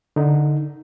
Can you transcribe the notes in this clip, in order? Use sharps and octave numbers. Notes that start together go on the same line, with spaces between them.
D3 D#4